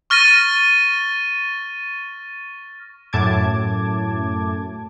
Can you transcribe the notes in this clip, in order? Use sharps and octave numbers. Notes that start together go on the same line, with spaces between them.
C#6 F6 A6 A#6 D#7
F#2 A2 A5 D6 G#6